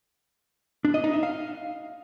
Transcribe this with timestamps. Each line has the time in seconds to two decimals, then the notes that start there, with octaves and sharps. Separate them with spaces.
0.85 D4
0.94 D#5
1.04 D#4
1.13 E5
1.23 F5